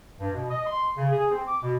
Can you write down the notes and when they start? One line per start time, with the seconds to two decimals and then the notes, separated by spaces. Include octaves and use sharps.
0.20 G2
0.34 B2
0.51 D#5
0.67 C6
0.97 C#3
1.12 G#4
1.31 C4
1.48 D6
1.63 B2